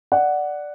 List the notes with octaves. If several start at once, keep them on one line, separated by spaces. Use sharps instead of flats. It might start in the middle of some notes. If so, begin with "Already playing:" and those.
D5 F#5